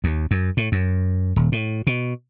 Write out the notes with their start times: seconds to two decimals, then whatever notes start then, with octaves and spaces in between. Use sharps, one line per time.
0.04 D#2
0.31 F#2
0.57 A2
0.72 F#2
1.36 D#1
1.52 A2
1.87 B2